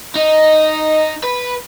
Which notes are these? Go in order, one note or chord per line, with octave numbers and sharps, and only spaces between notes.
D#4
B4